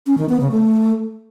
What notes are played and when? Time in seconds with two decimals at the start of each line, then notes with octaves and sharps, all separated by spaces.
0.06 C#4
0.18 D#3
0.29 B3
0.40 C#3
0.51 A3